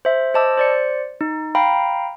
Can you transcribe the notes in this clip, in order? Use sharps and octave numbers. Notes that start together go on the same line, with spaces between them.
C5 E5
C5 D#5 A5 D6 E6
C5 D5 C#7
D#4
F5 G5 A#5 B5